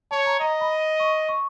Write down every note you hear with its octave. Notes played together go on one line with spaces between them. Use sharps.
C#5 A5
A#5
D#5 A#5
B5
C#6
C#6